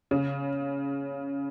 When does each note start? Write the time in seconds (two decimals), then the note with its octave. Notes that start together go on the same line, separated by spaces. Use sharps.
0.11 C#3